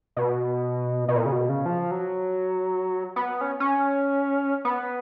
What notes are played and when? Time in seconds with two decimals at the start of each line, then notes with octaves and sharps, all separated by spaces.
0.17 B2
1.08 B2
1.16 A#2
1.26 C#3
1.32 B2
1.49 C#3
1.66 F3
1.91 F#3
3.16 B3
3.41 C#4
3.60 C#4
4.65 B3